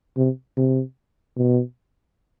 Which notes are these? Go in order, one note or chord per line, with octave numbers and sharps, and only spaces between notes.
C3
C3
B2